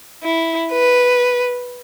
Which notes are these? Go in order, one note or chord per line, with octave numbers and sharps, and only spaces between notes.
E4
B4